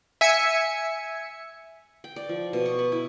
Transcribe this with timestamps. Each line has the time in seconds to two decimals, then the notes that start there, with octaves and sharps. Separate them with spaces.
0.21 E5 G#5 C#7
2.04 G5
2.16 D5
2.29 F3
2.53 B2
2.66 C#6
2.79 B4
2.92 E4